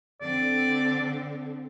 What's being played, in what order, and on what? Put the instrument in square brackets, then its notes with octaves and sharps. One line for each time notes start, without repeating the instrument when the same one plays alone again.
[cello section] D3 C4 [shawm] D5